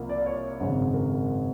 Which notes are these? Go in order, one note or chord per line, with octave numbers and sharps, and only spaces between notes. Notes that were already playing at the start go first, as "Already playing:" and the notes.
Already playing: C2 F3 A#3
D5
C#5
G#1 F#2 C#3
A#4